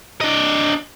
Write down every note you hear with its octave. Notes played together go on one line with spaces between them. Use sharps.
D4 D#5